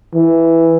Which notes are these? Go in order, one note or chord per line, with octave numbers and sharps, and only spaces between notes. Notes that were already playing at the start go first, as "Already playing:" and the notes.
E3